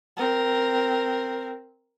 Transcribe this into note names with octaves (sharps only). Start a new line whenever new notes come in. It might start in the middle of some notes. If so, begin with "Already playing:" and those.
C4 A#4